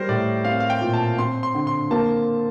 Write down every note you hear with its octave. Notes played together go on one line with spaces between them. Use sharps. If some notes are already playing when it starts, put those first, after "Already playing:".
Already playing: G3 A#4 C5
A2 D5
C4 F5
F5
G5
A#2
A5
C4 C6
C6
D3
C6
A#3 A5